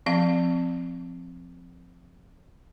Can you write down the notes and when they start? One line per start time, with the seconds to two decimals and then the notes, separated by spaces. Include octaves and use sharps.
0.06 F3 C4 F5